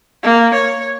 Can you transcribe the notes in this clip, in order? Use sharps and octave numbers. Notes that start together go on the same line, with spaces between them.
A#3
C#5